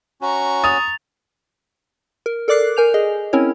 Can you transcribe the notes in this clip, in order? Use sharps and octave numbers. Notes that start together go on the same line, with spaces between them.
C#4 F#4 A#5 C#6
D#6 A6 F7
A#4
A4 A#4 D5 D6 F#6 C7
A#4 G#5 G6 F7
G#4 D#5
C4 C#4 E4 A#4 C#5